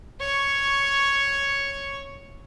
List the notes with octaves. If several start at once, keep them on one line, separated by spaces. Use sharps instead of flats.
C#5 C#6